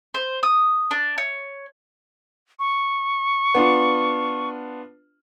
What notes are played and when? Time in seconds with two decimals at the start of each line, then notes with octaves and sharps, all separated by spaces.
0.14 C5
0.43 D#6
0.91 D4
1.18 C#5
2.59 C#6
3.54 B3 D4 F4